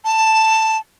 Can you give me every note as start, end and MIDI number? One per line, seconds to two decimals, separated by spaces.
0.05 0.78 81